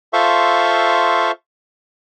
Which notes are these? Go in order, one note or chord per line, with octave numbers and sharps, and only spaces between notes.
F4 A4 C5 E5 F5 C#6